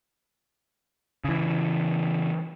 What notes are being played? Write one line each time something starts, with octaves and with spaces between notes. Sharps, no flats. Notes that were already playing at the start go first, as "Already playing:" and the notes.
C#3 E3